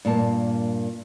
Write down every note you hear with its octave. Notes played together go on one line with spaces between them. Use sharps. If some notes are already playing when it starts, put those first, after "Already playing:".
G2 A#2 A#3 A5